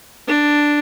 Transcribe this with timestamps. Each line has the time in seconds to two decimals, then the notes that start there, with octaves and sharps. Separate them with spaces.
0.27 D4